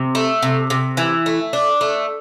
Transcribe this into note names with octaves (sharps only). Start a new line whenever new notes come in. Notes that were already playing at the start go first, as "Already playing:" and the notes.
Already playing: C3
A3
C3
C3
E3
A3
D4
A3